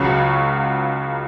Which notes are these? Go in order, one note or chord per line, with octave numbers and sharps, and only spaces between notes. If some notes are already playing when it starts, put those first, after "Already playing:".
Already playing: C#2 C#3 F#3 C#6